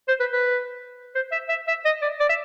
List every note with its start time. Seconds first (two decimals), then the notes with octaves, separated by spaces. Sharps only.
0.08 C5
0.20 B4
0.33 B4
1.15 C5
1.32 E5
1.49 E5
1.67 E5
1.85 D#5
2.02 D5
2.20 D5
2.29 E5